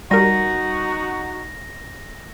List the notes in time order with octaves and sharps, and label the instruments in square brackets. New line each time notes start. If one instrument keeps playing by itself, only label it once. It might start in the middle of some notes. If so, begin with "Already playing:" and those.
[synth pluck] G3 A#4 [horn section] D#4 F#4 [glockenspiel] A#6